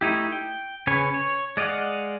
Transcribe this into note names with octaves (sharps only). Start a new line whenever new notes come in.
A3 D#4 E4 G4
G5
C#3 C#4 B4 C#5 G#5
C#5
G#3 D5 D#5 F5 F#5